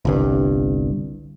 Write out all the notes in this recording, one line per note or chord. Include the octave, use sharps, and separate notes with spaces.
G1 C2 G2